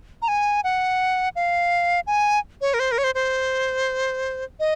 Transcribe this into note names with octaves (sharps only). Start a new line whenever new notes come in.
A#5
G#5
F#5
F5
G#5
C#5
A#4
C5
A#4
C#5
C5
C5
D#5